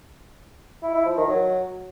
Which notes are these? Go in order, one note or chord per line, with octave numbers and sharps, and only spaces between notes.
E4
E4
F3
D#3
F#3